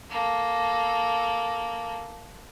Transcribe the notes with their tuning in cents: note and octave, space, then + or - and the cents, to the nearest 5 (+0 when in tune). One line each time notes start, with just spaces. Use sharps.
A#3 +0 A4 -10